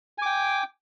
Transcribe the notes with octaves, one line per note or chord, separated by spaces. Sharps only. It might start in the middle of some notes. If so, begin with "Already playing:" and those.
G5 G#5 D6